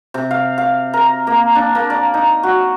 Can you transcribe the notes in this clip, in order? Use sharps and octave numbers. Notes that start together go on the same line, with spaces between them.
C3
F5
F5
A#4
A#3
D4
A#3
D5
D#4
F#4